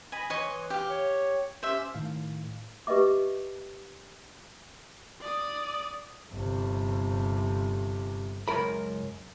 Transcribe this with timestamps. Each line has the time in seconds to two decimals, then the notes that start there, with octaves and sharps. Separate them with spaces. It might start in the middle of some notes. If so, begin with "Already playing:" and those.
0.12 D#5 G#5 B5
0.30 E3 C#5 D#5 C6
0.70 G4 F5
0.90 C#5
1.63 C#4 G4 C5 E5
1.94 A2 D#3 F5
2.87 G4 B4 D#5 E5 D6
5.21 D5 D#6
6.32 G1 C3
8.48 C#2 F#2 A#4 B5